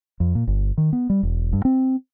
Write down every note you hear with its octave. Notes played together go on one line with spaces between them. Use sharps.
F2
A#2
G1
D#3
B3
G3
E1
G2
C4